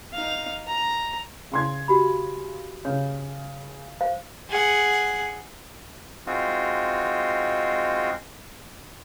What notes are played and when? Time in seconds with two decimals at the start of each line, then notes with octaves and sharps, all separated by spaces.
0.14 D#4 F5
0.68 A#5
1.52 C#3 C6 G#6
1.88 F#4 G4 B5
2.85 C#3 C#5
4.01 C5 F5
4.49 G#4 F#5
6.26 G#3 C4 D#4 F4 F#4